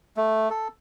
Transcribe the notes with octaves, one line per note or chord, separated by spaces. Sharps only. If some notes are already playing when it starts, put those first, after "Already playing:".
A3
A4